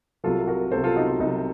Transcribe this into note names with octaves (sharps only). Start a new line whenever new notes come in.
C2 C3 F#3 F4 A4
F#4 A#4
C2 C3 F#3 A4 C5
F4 A4
D#4 F#4
F4
C2 C3 F#3 D#4